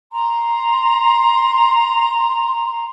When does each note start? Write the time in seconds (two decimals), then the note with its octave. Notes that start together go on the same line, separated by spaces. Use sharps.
0.11 A#5 C6